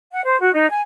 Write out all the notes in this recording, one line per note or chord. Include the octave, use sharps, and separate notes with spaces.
F#5
C5
F#4
D#4
G#5